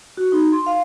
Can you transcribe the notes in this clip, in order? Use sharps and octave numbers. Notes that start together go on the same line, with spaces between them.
F#4
D#4
C6
F5